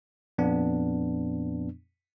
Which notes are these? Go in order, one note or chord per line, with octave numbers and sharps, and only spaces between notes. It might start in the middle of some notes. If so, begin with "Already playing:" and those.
F2 A#2 B3 D4